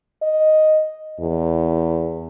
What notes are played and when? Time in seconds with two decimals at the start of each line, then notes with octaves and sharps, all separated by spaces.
0.22 D#5
1.20 E2